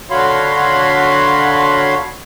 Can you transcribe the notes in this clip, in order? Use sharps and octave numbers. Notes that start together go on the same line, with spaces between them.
D3 F#4 C#5 F5 B5 C6